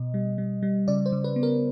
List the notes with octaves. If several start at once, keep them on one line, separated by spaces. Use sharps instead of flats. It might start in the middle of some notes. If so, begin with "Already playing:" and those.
Already playing: B2 D#5
G3
G3
G3
C#3 D5
C5
C#3
B4
B3
A#4